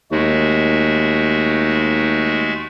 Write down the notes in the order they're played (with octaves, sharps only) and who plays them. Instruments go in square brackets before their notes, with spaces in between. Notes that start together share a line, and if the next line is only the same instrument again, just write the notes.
[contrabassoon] D#2 [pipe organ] G#3 A3 F#4